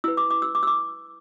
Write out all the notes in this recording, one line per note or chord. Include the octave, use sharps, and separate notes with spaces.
E4 B4 E6
D6
D6
E6
D6
E6
D6